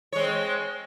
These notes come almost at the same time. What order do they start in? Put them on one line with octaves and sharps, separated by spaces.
C#5 G#3 C4